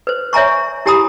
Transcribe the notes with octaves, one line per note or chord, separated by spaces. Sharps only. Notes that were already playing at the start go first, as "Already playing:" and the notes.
B4 C5
C#5 E5 G#5 A#5 C#6
E4 G4 G#5 A#5 B5 D#6